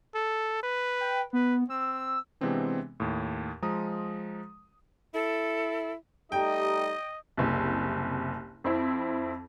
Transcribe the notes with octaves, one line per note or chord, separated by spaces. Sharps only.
A4
B4
G5
B3 B4
C4 E6
C3 E3 G#3 B3 C4 D4
D#2 A2
F3 G#3 A#5 D#6
E4 A4
G3 A3 D#4 G4 D#5 G5
F#1 C2
F2 C4 E4